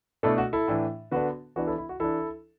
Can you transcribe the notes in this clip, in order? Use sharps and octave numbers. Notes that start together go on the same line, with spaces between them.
B2 A3 D4 E4 A4
F#4
E4 A4
A2 E3 D4
D3 B3 D4 F#4 B4
E3 B3 D4 F#4
E4 A4
E4
F#4
E3 D4 E4 A4